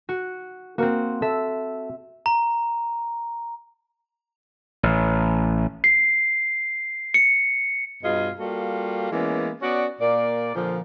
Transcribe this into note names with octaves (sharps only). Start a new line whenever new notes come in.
F#4
A#3 C4 F#4 A#4
A4 E5
A#5
A1
C7
C#7
G2 B2 F4 G#4 D#5
G3 A#3 F4 F#4 A4
E3 G#3 A#3 B3 C#4
B3 C#4 F#4 D5
A#2 A#3 D5
A#2 D3 F3